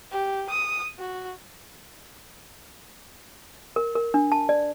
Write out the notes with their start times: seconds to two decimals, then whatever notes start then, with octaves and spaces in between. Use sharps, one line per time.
0.11 G4
0.49 D#6
0.99 F#4
3.76 A#4
3.95 A#4
4.14 D4
4.32 A5
4.49 D5